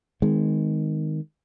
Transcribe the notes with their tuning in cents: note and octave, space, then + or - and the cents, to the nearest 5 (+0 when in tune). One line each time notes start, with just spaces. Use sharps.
D#3 +0 G#3 +0 C4 -45